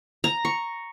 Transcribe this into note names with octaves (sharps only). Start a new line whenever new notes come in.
A#5
C#6